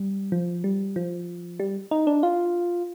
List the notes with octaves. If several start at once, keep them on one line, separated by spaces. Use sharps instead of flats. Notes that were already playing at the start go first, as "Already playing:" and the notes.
Already playing: G3
F3
G3
F3
G3
D#4
D4
F4